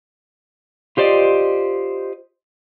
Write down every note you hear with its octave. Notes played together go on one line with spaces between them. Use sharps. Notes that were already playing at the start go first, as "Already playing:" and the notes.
F4 G4 C5 D5 D#5